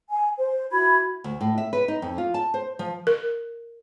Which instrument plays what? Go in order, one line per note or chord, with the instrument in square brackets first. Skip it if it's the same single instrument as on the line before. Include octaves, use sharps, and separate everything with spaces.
[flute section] G#5
C5
E4 F#4 B5 G#6
[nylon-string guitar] D2
A2
E5
B4
D#4
F2
F4
A5
C5
F3
[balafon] A#4